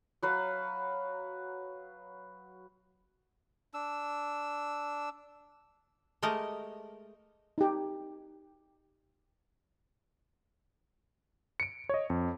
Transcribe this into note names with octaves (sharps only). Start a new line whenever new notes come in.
F#3 B4 F5
D4 E6
G#3 A3 G4 A#4 D#5
D#4 G4
C#7 D7
C#5 D#5
F2